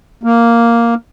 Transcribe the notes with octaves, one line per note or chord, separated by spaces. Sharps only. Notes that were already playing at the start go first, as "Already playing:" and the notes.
A#3